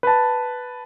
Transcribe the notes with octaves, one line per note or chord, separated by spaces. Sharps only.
B4 A5